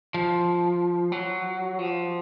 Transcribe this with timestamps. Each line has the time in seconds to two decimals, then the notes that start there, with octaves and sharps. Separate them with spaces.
0.14 F3
1.12 F#3
1.79 F3